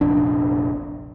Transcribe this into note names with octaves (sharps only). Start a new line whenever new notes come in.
F1 A#1 D4